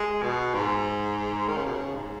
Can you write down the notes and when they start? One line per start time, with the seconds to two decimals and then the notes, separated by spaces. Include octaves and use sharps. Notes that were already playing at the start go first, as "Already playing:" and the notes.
Already playing: G#3
0.23 B2
0.54 G#2
1.48 D#3
1.57 C#3
1.66 B2
1.75 C#3
1.95 G#2